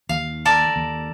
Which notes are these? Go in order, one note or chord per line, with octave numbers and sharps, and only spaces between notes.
D#2 F5
A4 A#4 D5
D#2